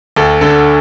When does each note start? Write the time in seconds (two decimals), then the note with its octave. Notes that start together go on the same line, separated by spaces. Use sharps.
0.16 D2 A4
0.41 D3 A4